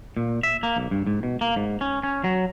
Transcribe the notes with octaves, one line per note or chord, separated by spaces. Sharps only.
A#2
E5
A#3
B1
G2
G#2
B2
A#3
G#2
C#4
C#4
F#3